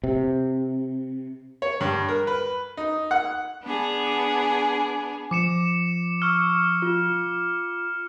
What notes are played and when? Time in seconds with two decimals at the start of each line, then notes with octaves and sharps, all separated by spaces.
0.04 C3
1.62 C#5
1.80 G2
2.09 A#4
2.27 B4
2.77 D#4
3.11 F#5
3.62 B3 D4 G#4
5.31 F3 D6 C#7 E7
6.22 C#6 E6 F6
6.82 F4